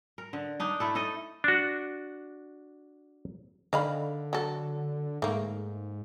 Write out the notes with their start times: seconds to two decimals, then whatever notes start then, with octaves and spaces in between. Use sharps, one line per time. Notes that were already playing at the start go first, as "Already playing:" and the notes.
0.18 A#4
0.33 D3
0.60 D4 D#4
0.80 A3 E4 A4
0.95 D#4 A4 D#5
1.44 D4 F#4
3.73 D3 D#3 F5 B5
4.33 F#3 A4
5.22 G#2 A3 A#3